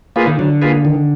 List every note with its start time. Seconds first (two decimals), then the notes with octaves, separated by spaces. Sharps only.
0.16 A#3 F4 G#4 B4
0.27 D#3
0.39 D3 F#3
0.62 A#3 F4 G#4 B4
0.85 D#3